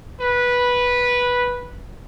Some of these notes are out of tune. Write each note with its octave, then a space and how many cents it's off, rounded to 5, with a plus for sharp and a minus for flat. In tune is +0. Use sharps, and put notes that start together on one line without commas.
B4 -10